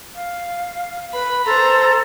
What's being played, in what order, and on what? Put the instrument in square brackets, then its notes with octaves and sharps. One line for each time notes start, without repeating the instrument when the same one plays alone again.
[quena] F5
[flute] B4 [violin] B5
[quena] A4 [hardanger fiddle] C5 [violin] A#5 [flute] C6